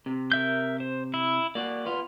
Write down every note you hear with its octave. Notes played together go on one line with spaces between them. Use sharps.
C3
A#4 E5 G6
C5
E4
A#3 F#4 D5
B3 F4